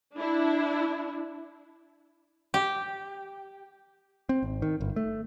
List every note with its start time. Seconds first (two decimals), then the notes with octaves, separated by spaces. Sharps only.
0.16 D4 E4
2.54 G4
4.29 C4
4.43 G#1
4.62 D#3
4.81 G1
4.96 A3